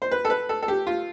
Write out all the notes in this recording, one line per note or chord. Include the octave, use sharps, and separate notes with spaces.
C5
B4
A4
B4
A4
A4
G4
F4